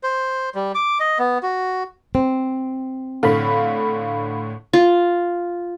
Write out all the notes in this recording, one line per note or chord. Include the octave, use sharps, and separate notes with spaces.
C5
G3
D6
D#5
B3
F#4
C4
A2 D3 F5 B5
F4